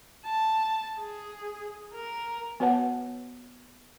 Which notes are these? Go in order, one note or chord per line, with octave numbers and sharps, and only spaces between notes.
A5
G#4
A#4
B3 F#4 B4 C#5 F#5 A5